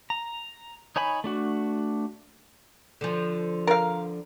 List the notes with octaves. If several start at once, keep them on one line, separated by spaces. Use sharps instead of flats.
A#5
D#4 C#5 G#5 B5
A3 D4 F#4
D3 F3
A#4 F5